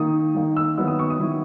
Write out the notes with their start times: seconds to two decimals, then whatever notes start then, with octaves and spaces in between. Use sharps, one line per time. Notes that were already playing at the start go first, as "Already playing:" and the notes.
Already playing: D#3 A#3 D#4 D#6
0.35 D#3 A#3 D#4
0.57 E6
0.78 D#3 F#3 B3 E4 E6
0.88 D#6
0.99 C#6
1.10 D#6
1.19 D#3 F#3 B3 E4